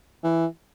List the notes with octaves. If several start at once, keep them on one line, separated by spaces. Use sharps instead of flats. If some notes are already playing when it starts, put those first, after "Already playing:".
E3